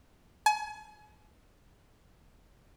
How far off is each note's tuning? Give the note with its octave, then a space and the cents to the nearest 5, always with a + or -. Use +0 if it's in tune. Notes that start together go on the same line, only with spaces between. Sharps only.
G#5 +35